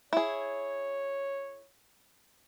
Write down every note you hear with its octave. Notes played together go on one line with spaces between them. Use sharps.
E4 G#4 C#5